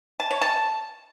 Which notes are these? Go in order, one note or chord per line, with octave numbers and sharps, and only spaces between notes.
A5
C#5
A5